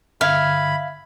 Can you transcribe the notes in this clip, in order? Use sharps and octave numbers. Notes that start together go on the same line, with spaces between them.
G2 D3 E5 F5 B5 G#6